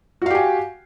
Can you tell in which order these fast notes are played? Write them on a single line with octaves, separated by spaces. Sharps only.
F#4 F5 G4 G#5